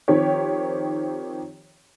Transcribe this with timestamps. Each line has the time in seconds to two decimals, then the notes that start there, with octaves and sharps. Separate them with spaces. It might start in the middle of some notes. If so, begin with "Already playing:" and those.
0.08 D#3 F3 C4 G4 C#5